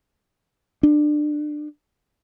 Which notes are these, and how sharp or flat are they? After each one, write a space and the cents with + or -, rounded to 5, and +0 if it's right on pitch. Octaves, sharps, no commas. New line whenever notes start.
D4 +25